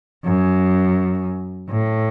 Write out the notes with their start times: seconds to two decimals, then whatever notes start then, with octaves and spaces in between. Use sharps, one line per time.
0.25 F#2
1.70 A2